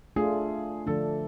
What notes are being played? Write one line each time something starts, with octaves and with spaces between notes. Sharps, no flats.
A3 D4 F4 G#4
D3 F3 A3 D4 A4